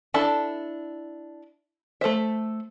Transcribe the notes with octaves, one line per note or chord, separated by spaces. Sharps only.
D4 E4 A4 E5 A5
A3 A4 C5 E5